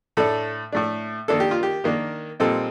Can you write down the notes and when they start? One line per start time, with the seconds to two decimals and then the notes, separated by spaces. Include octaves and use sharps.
0.17 A2 A3 D4 A4
0.72 A2 A3 D4
1.28 D#3 A#3 D4 A4
1.40 G4
1.51 F4
1.63 G4
1.84 D#3 A#3 D4
2.40 A#2 G3 C4 D#4 A4